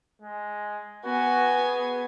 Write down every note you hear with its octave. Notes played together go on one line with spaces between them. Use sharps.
G#3
B3 F#4 G#5
G#4